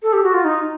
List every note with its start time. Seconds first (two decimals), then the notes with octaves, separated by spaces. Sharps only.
0.02 A4
0.12 G4
0.23 F#4
0.33 F4
0.44 D#4